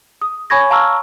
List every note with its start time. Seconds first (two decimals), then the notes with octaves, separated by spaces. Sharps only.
0.22 D#6
0.50 C#5 G#5 B5 C#6 G#6 A#6
0.70 F5 A5 A#5 C#6 E6 F6